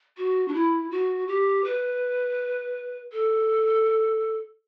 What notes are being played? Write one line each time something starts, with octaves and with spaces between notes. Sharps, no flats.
F#4
D4
E4
F#4
G4
B4
A4